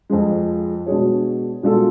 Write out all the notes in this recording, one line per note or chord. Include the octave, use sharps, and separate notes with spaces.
F2 F3 G#3
B2 G#3 D4 G#4 C#5
B2 G#3 D4 F4 A4